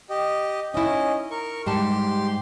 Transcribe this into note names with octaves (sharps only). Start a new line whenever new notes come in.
G4 D#5
C#4 D#4 E4 D#5
A#4 C#6
G#2 G3 G4 A5 C6